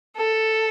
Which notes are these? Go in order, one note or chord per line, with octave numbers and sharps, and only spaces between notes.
A4